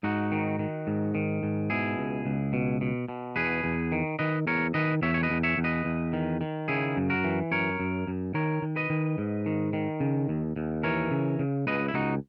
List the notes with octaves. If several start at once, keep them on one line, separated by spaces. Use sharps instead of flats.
G#2 D#4 F#4
D#3
D#3
G#2
D#3
G#2
B2 E4 G#4
C#2
C#2
B2
B2
B2
E2 G#4 B4
E2
D#3
D#3 B4 D#5
E2 A#4 C#5
D#3 B4 D#5
E2 C#5 E5
C#5
B4 D#5
E2
C#5 E5
E2
B4 D#5
E2
D#3
D#3
C#3 E4 G#4
F#2
F#4 A#4
E3
F#2 A#4 C#5
F#2
F#2
D#3 A#4 C#5
D#3
B4 D#5
D#3
G#2
D#3
D#3
C#3
D#2
D#2
E3 A#4 C#5
C#3
C#3
C#2 B4 D#5
E4
C#2 D#4 F#4